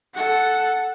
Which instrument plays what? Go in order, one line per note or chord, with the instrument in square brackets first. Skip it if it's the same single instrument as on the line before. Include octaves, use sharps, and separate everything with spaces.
[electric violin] A4 F#5